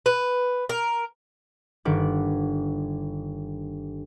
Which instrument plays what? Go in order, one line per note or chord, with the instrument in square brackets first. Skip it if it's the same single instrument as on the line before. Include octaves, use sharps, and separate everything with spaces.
[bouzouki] B4
A#4
[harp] G1 D#3 B4 F#5 D6